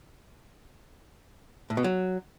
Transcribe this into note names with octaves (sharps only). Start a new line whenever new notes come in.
A2
B2
F#3